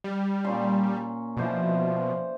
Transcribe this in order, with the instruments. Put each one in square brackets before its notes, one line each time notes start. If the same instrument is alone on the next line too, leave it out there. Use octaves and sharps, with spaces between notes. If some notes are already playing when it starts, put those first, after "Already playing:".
[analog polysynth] G3
[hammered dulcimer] A#2 C#4 C6
[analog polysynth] B2 F3 [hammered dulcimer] E3 C5 D5